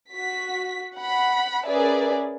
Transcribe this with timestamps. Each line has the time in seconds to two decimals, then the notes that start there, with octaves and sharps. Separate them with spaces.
0.12 F#4 B6
0.95 F#5 B5
1.66 C#4 G#4 A#4 B4 D5 E5